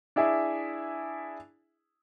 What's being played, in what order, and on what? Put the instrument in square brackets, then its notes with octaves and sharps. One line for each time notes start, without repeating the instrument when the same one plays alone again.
[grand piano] D4 E4 G#4 E5